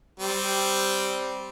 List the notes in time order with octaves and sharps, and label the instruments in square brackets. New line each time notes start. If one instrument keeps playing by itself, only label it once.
[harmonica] G3 C4